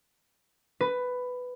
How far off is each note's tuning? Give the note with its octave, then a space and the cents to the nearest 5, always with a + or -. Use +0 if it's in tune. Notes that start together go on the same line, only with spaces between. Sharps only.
B4 +10